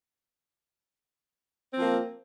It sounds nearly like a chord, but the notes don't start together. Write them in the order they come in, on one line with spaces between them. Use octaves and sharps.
C4 F3 A#3